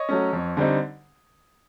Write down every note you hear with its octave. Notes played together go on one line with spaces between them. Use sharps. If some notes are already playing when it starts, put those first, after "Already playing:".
Already playing: C#5 D#5
F#3 A3 C#4
F2
D3 G3 C4 D#4